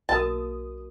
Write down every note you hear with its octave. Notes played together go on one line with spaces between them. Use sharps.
B1 A#3 F#4 A#4 D#5 A5 D#6